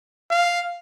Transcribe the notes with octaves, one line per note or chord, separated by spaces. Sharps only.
F5